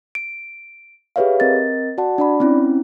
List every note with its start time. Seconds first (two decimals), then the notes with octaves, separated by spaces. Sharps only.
0.15 D7
1.16 G4 G#4 B4 C#5 E5 F5
1.40 C4 A#4 D#5 A6
1.98 F#4 D5 F#5 A5
2.18 D4 D5 B5
2.40 C4 C#4 E4